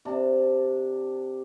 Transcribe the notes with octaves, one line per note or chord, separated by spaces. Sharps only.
C3 D4